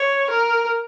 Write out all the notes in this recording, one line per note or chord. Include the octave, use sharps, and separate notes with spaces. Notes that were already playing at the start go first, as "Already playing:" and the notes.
Already playing: C#5
A#4